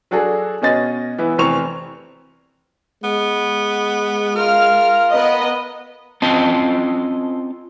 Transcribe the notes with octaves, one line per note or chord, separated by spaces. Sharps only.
F#3 D4 F#4 G#4 A4
B2 C#4 D#5 A6
E3 B3 E4
F1 E3 C4 C#6 F7
G#3 B3
F4 A#4 F6
B3 A#4 D#5
C4 C#4 F4 D#5 G5 A5